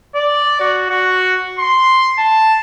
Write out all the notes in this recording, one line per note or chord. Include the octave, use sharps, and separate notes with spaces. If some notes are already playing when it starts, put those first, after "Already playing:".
D5
F#4
F#4
C6
A5